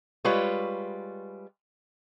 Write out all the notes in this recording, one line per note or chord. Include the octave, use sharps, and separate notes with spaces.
G3 G#3 F4 B4 C#5